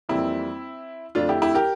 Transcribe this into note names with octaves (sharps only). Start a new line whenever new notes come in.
F2 E3 G3 A#3 C4 E4
F2 D3 A3 D4 F4
E4 G4
E4 G4
G4 A#4